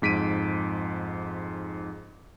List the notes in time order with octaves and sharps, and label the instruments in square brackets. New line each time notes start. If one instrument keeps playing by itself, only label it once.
[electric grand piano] F2 G#2 B6 D7 D#7